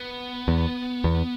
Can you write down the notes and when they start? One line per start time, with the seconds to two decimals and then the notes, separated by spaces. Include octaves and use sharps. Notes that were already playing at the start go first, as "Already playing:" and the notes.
Already playing: B3
0.48 E2
1.04 E2